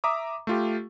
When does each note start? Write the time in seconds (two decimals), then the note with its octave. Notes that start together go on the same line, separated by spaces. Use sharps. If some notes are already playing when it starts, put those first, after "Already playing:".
0.04 E5 A#5 D6 D#6
0.47 A3 F4 G4